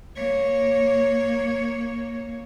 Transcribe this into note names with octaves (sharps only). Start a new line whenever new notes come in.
A#3 C#5